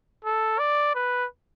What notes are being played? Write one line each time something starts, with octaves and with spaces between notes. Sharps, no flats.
A4
D5
B4